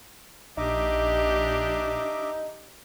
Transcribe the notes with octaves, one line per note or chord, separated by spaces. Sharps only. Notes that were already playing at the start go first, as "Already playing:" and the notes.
A#1 D4 D#4 G4 D#5 E5 D6